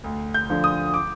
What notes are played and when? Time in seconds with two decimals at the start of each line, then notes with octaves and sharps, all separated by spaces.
0.04 D2
0.34 G6
0.50 D3 F3
0.64 D#6
0.94 D6